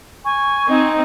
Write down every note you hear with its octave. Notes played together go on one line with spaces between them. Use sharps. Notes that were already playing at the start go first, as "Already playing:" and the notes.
G#5 C#6
C4 D#4 D#5